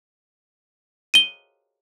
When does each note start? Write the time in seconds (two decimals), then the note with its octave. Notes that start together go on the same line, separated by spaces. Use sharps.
1.14 D#7 G7